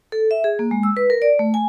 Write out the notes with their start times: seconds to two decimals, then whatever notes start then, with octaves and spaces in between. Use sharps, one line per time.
0.12 A4
0.31 E5
0.44 G#4
0.59 A#3
0.71 G#3
0.83 E6
0.97 B4
1.10 A#4
1.22 D5
1.39 A3
1.54 G#5